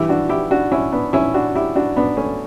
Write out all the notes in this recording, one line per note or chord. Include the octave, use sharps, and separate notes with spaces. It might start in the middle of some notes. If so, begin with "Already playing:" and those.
Already playing: G2 E3 E4 G4
D4 F#4
E4 G4
D4 F#4
C#4 E4
B3 D4
C#4 E4
D4 F#4
E4 G4
D4 F#4
B3 D4
A3 C#4